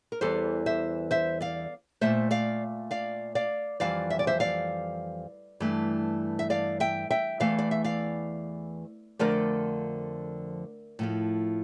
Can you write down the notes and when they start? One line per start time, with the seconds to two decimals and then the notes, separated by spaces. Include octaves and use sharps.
0.12 A#4
0.21 E2 E3 G3 A4 C5
0.66 C5 E5
1.11 C5 E5
1.41 D5 F5
2.01 A#2 F3 A3 C5 E5
2.31 D5 F5
2.91 D5 F5
3.35 D5 F5
3.80 F2 E3 G3 D5 F5
4.10 E5
4.19 D5
4.27 C5 E5
4.40 D5 F5
5.60 G2 E3 A3
6.39 E5
6.50 D5 F5
6.80 E5 G5
7.10 E5 G5
7.40 E2 E3 A3 D5 F5
7.59 D5
7.71 E5
7.84 D5 F5
9.19 F2 D3 F3 A3 A#4 D5
10.99 A2 F3 A3